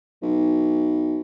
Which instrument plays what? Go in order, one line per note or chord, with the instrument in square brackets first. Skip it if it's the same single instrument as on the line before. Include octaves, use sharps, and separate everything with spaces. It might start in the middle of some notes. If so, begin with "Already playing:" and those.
[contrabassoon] B1